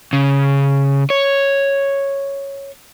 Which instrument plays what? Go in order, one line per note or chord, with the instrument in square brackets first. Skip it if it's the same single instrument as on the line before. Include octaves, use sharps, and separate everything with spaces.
[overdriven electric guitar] C#3
C#5